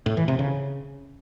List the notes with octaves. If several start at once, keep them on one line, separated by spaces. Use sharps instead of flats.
A2
E3
C3
C#3